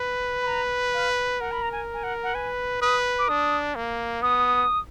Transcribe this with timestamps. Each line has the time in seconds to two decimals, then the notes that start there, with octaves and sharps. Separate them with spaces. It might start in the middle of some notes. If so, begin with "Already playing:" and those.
Already playing: B4
0.43 B5
0.47 A#5
0.94 F5
1.41 A#4 F#5
1.52 B5
1.62 A#5
1.72 G#5
1.94 G#5
2.03 F#5
2.23 F#5
2.34 B4 G#5
2.82 B4 D#6
3.19 D6
3.29 D4 D#6
3.75 A#3
4.22 B3 D#6